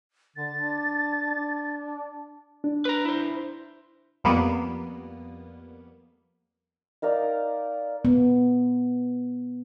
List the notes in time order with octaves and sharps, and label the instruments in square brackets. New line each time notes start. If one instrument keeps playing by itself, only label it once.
[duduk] D3 [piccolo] A6
[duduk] D4
D4
[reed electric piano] D4
[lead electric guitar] B4 A#5
E4 C5
[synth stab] F2 G3 A#3 B3
[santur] D#4 A#4 D5 F5
[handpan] B3